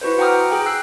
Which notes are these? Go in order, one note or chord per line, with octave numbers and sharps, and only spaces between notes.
E4 F#4 B4 C5
F#5 G5 A#5 D6 D#6 F6
G#4 G5
E6 F#6 C7